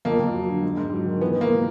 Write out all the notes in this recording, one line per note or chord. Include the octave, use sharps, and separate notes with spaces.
F2 A#3
F2
F#3
D3
G#2
G#2
F#3
D#3
E3 B3
G#2
A#3